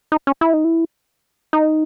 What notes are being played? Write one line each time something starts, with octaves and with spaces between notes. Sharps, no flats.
D#4
C#4
E4
D#4
E4
D#4